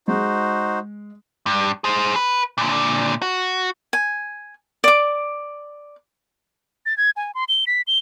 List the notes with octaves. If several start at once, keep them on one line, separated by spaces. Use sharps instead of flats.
G#3 D#4 F#4 C5
G2
G#4 C5
B4
A#2 D3
F#4
G#5
D5 D6
A6
G#6
G#5
C6
G7
B6
G7